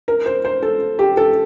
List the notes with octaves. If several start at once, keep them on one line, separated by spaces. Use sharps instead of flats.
A#4
C5
C5
A4
G4
A4